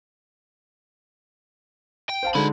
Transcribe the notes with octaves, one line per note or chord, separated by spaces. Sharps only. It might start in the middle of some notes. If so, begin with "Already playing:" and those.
G5
C5 F5 A5
D3 G#3 D#4 B5